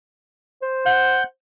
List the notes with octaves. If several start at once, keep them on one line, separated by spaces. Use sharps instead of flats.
C5
F#5 G6